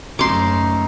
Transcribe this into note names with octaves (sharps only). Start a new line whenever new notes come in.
F#1 A3 C#4 D#4 C6 D6